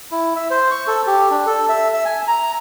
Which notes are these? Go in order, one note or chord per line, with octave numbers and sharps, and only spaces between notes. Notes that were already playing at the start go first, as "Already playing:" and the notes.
E4
E5
C5
C#6
A4
G4
D4
A4
E5
E5
G#5
A#5